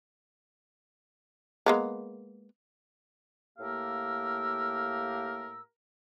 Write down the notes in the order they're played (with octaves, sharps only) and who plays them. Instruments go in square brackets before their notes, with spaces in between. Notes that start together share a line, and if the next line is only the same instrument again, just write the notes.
[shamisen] G#3 A#3 B3
[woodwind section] A2 A#3 G4 A#4 F5 E6